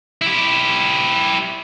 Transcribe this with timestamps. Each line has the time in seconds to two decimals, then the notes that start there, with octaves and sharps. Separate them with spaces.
0.22 E4 G4